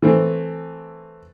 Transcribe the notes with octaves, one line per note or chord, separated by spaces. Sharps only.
E3 A3 C4